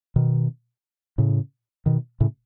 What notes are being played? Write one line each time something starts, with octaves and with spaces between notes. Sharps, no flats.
B2 D#3
A2 C#3
B2 D#3
A2 C#3